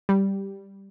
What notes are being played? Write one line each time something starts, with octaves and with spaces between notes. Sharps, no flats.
G3